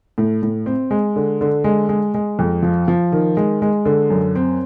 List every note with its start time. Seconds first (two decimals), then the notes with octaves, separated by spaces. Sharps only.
0.18 A2
0.43 A2
0.66 C4
0.91 G#3
1.16 D3
1.41 D3
1.64 G#3
1.89 G#3
2.14 G#3
2.39 F2
2.63 F3
2.88 F3
3.12 D#3
3.37 G#3
3.62 G#3
3.85 D3
4.10 F#2
4.35 C4